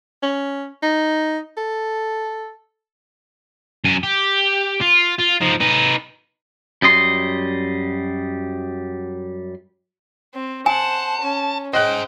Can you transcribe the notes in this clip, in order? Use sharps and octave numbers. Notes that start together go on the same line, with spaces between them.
C#4
D#4
A4
F#2 G#5
G4
F4
F4
F3 D#4
D#4 B4
F#2 G3 D#5 C6
C4
C5 F#5 G#5 A5
C#4
G#4 C5 D#5 G5 F#6